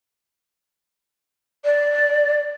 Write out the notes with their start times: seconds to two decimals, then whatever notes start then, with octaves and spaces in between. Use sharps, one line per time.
1.65 D5